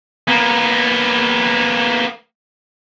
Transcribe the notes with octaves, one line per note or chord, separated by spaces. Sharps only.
A#3 B3